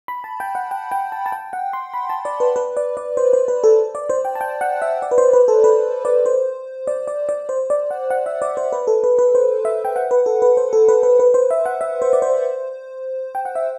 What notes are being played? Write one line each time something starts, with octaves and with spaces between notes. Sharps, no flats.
B5
A5
G5
F#5
G5
G5
A5
A5
G5
F#5
C6
B5
A5
D5
B4
B4
D5
D5
C5
C5
B4
A4
D5
C5
G5
A5
G5
F#5
E5
D5
B4
C5
B4
A4
B4
D5
C5
D5
D5
D5
C5
D5
F#5
F#5
E5
D5
C5
B4
A4
B4
B4
C5
E5
G5
F#5
B4
A4
B4
C5
A4
B4
B4
B4
C5
E5
F#5
E5
C5
D5
C5
G5
F#5
E5